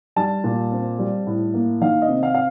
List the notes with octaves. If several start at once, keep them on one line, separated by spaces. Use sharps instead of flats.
G3 A5
A#2
C4
G3
A2
A#3
D#3 F5
D#5
C3
F5
F5